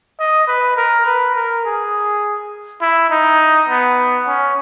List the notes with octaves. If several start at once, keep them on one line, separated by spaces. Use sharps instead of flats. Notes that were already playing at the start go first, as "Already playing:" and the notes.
D#5
B4
A#4
B4
A#4
G#4
E4
D#4
B3
C#4